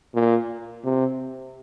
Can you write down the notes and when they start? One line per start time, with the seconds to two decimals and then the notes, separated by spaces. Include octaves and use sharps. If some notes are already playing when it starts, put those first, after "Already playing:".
0.15 A#2
0.84 C3